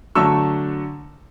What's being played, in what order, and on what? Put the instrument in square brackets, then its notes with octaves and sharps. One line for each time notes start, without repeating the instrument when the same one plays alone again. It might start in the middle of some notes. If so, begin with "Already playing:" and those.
[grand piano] D3 F#3 A3 C#6 E6